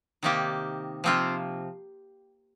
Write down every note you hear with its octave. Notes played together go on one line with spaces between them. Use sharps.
C3 D#3 A#3 D#4 G4
C3 F3 A#3 C4 F4